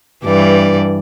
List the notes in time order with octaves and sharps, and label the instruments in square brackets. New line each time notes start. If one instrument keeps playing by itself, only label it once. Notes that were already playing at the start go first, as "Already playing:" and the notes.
[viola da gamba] G2 E3 D5